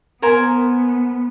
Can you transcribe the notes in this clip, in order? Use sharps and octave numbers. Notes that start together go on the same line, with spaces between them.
B3 A#4 C5 G#5